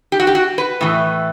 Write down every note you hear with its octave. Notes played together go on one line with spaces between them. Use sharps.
G4
F#4
G4
F#4
B4
A2 E3 A3